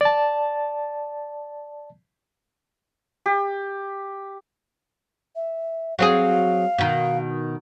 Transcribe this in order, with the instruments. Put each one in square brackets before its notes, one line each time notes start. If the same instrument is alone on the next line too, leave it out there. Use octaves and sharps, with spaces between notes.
[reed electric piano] D5 A5
[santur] G4
[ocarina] E5
[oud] F#3 C4 G#4 [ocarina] F5
[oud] B2 D#3